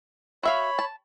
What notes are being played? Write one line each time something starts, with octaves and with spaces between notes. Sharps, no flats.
F#4 C#5 E5 F5 B5
A5